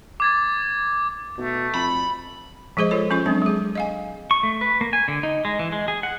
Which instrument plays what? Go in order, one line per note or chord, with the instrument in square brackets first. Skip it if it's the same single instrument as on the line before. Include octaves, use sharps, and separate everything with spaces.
[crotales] D6 G#6 A6
[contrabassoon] B2 [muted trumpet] A3
[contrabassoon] F2 [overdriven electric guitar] B5
[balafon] F3 G#3 G#4 C5 D#5
F4 A4 C#5
F3 C#4 F4 C#6
F#3 G#3 C4 D4
G#3 G#4
D#5 F5 G#5
[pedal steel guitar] C#6
A3
B4
A#3
G#5
D3
D#4
G#3
E3
G#3
G#4
F#5